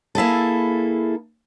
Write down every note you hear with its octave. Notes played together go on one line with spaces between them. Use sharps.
A#3 E4 G#4 A4